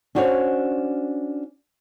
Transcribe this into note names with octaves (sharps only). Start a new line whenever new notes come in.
C#4 D4 F#4 C5 C#5 F5